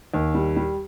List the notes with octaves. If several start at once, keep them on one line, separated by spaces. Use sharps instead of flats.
D#2
G3
G3